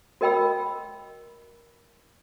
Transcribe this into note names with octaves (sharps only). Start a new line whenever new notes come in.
F#4 A#4 D#5 G5 B5 E6